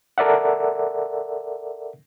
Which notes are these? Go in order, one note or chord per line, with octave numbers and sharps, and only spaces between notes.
A4 A#4 D5 E5 F#5